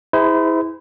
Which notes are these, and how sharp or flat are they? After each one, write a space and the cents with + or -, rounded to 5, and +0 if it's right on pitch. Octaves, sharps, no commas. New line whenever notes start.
E4 -25 G#4 -20 C5 -40